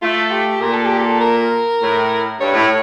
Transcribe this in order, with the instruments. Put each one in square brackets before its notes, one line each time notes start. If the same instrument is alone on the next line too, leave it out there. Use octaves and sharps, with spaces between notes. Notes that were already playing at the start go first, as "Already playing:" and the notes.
[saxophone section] A3 [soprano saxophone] F4
[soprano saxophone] G4
[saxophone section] A#2 [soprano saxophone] A#4
[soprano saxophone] A4
G4
A4
A#4
[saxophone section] A2
[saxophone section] G2 [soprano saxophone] C#5
[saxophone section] A2